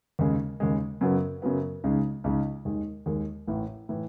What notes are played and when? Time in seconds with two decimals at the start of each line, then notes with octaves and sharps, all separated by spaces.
0.19 D#2 C#3 G#3
0.60 D#2 C#3 G#3
1.01 F#2 C#3 F#3 B3
1.42 F#2 C#3 F#3 B3
1.84 C#2 C#3 G#3 D#4
2.24 C#2 C#3 G#3 D#4
2.65 D#2 D#3 G#3
3.06 D#2 D#3 G#3
3.47 A1 A2 E3
3.89 A2 E3